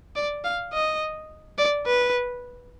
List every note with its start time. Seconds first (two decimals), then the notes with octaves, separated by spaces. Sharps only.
0.16 D5
0.44 F5
0.73 D#5
1.58 D5
1.87 B4